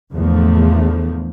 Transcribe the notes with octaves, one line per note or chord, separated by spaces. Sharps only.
E2 A2 D3 F3 A3 A#3